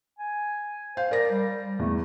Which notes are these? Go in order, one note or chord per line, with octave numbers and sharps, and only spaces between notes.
G#5
C5 F5
A#4 D5 A#6
G3
E2 A3